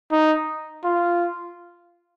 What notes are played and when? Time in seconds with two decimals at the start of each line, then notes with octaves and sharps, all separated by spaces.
0.12 D#4
0.85 F4